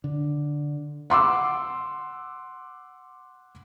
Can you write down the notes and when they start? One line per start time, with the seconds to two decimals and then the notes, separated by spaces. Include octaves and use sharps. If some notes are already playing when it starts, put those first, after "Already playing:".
0.04 D3
1.10 F#5 C6 D6 E6